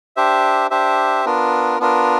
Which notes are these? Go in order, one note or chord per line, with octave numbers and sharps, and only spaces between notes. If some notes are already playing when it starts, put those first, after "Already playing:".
D4 G4 C5 E5
D4 G4 C5 E5
B3 D4 F4 A#4
B3 D4 F4 A#4